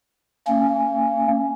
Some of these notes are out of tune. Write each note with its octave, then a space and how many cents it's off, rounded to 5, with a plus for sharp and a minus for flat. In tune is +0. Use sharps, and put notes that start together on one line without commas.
A#3 -35 C#4 -5